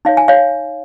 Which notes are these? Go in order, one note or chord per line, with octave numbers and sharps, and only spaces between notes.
D#4 C#5 F5
G#5
C#5 F5